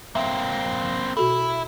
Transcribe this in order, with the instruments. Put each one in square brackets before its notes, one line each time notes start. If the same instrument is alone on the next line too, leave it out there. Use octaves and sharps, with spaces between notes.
[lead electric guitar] A#3 C4 [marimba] E5
[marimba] B2 F#4 A4 [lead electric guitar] E4